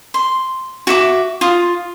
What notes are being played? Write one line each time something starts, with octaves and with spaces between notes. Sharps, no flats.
C6
F#4 E5 D6
F4 D#6